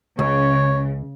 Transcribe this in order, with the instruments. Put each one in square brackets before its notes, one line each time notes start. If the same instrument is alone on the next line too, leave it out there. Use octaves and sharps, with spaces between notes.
[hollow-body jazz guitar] C#2 [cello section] C#3 [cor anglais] C#5